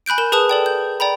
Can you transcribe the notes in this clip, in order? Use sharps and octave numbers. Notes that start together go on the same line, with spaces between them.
G#5 B5 F#6 G6 D7
A#4 E7
G#4 B4 A5 D#6 F#6 E7
A4 D5 G5
G6
D5 G5 A#5 B5